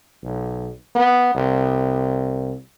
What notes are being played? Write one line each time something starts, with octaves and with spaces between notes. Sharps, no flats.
B1
B3
C2